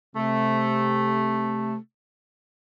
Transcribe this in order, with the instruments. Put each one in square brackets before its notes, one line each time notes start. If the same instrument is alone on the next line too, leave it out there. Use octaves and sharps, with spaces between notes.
[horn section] C3 A3